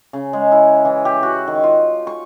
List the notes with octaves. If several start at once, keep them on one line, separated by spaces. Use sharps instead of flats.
C#3
G#3
E4
E3
G4
F#4
D#3
F4
C#6